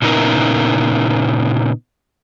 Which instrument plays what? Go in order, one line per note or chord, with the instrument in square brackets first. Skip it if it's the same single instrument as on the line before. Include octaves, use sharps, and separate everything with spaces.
[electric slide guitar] A#2 C#3 B3 D#4 E4 A#4